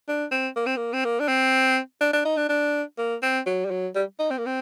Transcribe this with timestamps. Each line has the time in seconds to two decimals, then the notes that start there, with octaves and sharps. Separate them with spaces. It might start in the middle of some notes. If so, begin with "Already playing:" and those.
0.08 D4
0.31 C4
0.56 A#3
0.66 C4
0.77 A#3
0.93 C4
1.05 A#3
1.20 D4
1.28 C4
2.01 D4
2.13 D4
2.25 D#4
2.37 D4
2.49 D4
2.98 A#3
3.23 C4
3.46 F#3
3.66 G3
3.71 F#3
3.95 G3
4.19 D#4
4.31 C4
4.38 A#3
4.46 C4